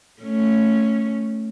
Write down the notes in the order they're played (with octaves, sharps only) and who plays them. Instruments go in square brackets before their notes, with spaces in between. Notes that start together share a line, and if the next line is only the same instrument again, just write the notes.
[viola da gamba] A3 C#4